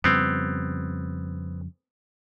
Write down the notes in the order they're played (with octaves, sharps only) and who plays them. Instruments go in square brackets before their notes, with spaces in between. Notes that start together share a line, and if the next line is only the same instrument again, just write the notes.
[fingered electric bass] F2 C#3 G3 [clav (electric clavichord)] B3 C4